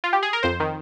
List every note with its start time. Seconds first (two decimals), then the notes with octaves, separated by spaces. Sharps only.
0.04 F4
0.13 G4
0.23 G#4
0.33 A#4
0.43 F2 C5
0.60 D#3